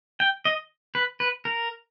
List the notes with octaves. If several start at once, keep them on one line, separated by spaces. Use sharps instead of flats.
G5
D#5
B4
B4
A#4